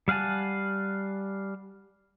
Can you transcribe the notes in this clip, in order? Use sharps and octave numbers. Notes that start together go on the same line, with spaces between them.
G3 F5 F#5 G#5 A5